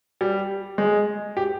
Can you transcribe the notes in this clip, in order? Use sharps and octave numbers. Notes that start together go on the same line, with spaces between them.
G3
G#3
G4